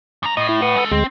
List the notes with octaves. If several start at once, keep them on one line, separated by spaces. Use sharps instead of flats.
F#2 A#5
A2 D#5 D#6
E4
B4 F#5 D#6
G#3 A4
D2 G#3 C4